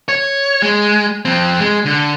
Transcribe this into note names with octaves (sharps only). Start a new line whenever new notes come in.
C#5
G#3
F2 C4
G#3
D3